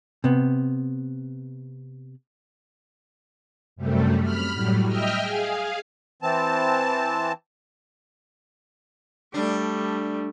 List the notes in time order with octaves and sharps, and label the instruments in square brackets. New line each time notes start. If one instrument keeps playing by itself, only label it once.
[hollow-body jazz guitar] C3 B3
[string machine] F#2 C3 G3 A3
B5 F6
A2 F#3 G3
D#5 E5 G5 F6
G#4 F5
[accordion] E3 C4 A5
[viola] G3 A3 [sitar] D4